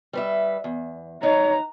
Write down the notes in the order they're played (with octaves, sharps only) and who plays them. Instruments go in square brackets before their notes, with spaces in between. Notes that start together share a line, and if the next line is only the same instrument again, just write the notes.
[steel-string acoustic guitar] G3 B4 E5
E2
[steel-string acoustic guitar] D#4 B4 [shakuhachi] C#5 [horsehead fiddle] A#5